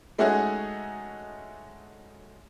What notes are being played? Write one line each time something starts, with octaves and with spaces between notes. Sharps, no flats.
G#3 A3 C#4 D#4 F#4 G#4